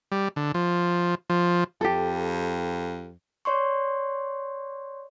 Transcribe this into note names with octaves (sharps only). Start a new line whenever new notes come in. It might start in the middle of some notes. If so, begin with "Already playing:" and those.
G3
D3
F3
F3
F2 G4 A4
C#5 D5 C6 C#6